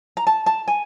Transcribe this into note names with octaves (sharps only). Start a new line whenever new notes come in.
A#5
A5
A5
G#5